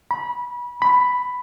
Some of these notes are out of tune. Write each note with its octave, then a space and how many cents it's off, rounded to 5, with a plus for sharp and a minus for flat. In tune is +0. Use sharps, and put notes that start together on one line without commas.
B5 -25
B5 +5